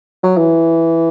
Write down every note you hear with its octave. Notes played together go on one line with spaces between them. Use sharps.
F#3
E3